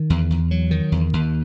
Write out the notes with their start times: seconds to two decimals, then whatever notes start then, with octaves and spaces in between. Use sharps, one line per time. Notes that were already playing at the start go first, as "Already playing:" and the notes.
Already playing: D#3
0.10 E2
0.31 E2
0.51 F#3
0.71 D#3
0.92 E2
1.13 D#2